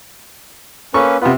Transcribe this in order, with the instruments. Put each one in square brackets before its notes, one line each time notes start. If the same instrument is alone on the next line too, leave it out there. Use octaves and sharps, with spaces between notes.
[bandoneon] A#3 C#4 B4 [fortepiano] A4 C#6
[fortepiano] C3 B4 [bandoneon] B3 F4